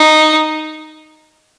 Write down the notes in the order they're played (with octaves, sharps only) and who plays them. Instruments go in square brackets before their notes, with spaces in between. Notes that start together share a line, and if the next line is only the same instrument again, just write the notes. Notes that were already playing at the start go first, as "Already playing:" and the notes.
Already playing: [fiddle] D#4